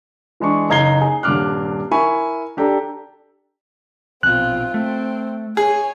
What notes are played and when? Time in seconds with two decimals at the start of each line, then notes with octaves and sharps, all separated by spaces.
0.40 E3 G#3 D4 C#6
0.69 F#1 D#4 A#5 G#6 C7 G7
1.01 G#4
1.23 D#1 G2 D4 D6 F6 F#6
1.91 E4 A#4 G#5 B5 C#6
2.57 D4 G4 A4 D5 A#5
4.23 A#1 B2 C4 F4 F#6
4.74 A3 C4
5.57 G#4 C#5 G#5